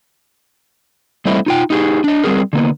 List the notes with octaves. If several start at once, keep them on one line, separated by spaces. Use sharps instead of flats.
G3 A3 C4 E4 D#5
D#4 F4 G5
D#4 G4 G#4
D4 D#5
G3 C4 G#4 A#4
D3 A#3 B3